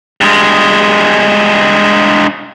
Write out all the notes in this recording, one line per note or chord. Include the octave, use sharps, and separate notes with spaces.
G2 G#3